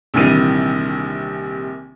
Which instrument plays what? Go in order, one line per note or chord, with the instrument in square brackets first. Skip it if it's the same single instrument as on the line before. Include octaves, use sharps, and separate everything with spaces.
[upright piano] A#1 C3 D#3 E3 G3 D#7